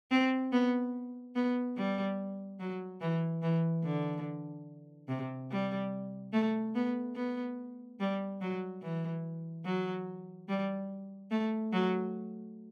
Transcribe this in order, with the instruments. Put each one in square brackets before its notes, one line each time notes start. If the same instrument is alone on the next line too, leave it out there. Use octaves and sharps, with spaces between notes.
[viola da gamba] C4
B3
B3
G3
F#3
E3
E3
D3
C3
G3
A3
B3
B3
G3
F#3
E3
F#3
G3
A3
F#3